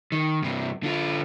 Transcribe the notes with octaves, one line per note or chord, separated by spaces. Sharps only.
D#3
G2 C3
D3 F4